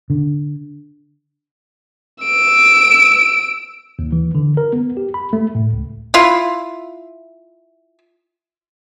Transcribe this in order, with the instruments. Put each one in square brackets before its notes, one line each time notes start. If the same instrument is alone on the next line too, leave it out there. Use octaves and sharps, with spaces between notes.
[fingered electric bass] D3
[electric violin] E6 D7
[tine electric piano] D#2
E3
D3
A#4
B3
G4
B5
A3
A2
C#2
[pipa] E4 F4